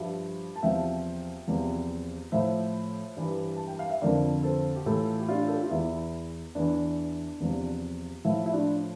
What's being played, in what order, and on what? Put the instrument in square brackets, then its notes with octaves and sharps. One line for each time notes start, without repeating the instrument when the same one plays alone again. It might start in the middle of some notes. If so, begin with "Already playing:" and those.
Already playing: [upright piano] G2 F3 E5
A5
E2 C3 F3 E5 G5
E2 C3 F3
A2 F3 C5 E5
G2 E3
A5
G5
F5
E5
F2 D3 F3 A#4 D5
A4 C5
G4
A2 E3 F4 A4
G4
D4 F4
A4
G4
F4
E2 E3 E4
E2 E3 D4
E2 C3 F3
A2 F3 E4
E4
D4 F4